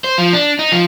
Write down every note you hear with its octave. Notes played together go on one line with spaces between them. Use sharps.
C5
F3
D4
D#4
F3